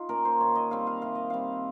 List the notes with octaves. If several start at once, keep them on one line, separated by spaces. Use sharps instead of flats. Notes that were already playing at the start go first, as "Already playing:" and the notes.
Already playing: D#4 F4
A#3 C#4 A#4
C5
D#3 C#5
D#5
G3 C4 F5
F5
C3 F5
D#5
G3 C4 F5